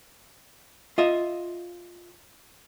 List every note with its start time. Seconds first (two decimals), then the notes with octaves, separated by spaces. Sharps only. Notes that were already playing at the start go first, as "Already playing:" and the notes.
0.98 F4 D#5 E5